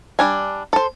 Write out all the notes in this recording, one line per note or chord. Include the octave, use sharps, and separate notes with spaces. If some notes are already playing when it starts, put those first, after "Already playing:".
G3 D4 G#5
A4 C5